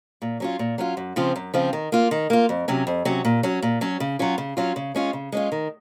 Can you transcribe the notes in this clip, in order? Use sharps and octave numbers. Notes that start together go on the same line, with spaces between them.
A#2
F#3 C#4 F4
A#2
F#3 C#4 F4
F#2
C#3 F3 C4 F4
F#2
C#3 F3 C4 F4
D#3
A#3 F4
D#3
A#3 F4
F2
C3 F#3 C#4
F2
C3 F#3 C#4
A#2
F#3 C#4
A#2
F#3 C#4
C#3
F#3 C#4 F4
C#3
F#3 C#4 F4
C#3
G#3 C#4 F4
C#3
G#3 C#4 F4
D#3